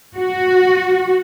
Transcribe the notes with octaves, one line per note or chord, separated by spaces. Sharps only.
F#4